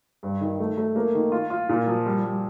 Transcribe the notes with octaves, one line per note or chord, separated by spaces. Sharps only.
G2
D#3
A3
A3
A#3
D#3
F4
F4
A#2
F3
G3
G3